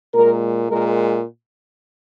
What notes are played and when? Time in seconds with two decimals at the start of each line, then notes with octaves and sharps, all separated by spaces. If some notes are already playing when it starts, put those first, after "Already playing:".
0.14 A#2 G#3 A#4
0.69 A#2 G#3 A#4